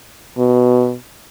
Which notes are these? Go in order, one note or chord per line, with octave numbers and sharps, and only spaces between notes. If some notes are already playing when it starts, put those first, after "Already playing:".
B2